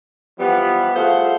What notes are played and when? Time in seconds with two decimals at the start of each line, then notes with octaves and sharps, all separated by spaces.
0.38 E3 F3 G3 B3
0.95 A3 F4 G#4 C5 F5 F#5